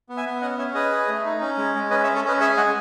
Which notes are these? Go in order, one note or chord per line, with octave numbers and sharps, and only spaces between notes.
B3
E5 G#5
B3
C#4 D#5 F#5
C#4 C#5 E5
G#4 B4 D#5
G#4
A3
D#4
C#4
G#3
G#3
C#4 B4 D#5
C#5 E5
C#4
A4 C#5
C#4 B4 D#5
G#4 C#5 E5
G#3 D#5 F#5